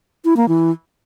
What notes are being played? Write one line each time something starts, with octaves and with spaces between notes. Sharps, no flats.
E4
A#3
E3